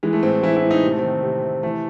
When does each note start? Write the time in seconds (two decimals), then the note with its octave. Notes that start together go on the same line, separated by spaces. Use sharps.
0.03 E3 G#3
0.13 A3
0.23 A2 C4
0.43 E3 E4
0.56 E4
0.63 A2
0.71 D#4
0.83 C3 C4
0.91 A3
0.98 D#3 C4
1.23 C3
1.43 C3
1.63 E3 A3